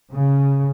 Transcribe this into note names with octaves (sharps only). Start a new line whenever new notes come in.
C#3